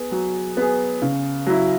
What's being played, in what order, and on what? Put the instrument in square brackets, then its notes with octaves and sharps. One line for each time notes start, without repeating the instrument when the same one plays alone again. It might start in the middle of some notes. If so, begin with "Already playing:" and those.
Already playing: [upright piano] B3 G#4
F#3
B3 G#4
C#3
F#3 E4